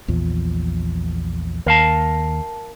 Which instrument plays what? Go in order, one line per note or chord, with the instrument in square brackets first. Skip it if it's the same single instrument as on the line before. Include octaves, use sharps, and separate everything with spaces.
[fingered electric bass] A#1 E2 F3
[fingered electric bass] D#2 [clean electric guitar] A#4 F5 A5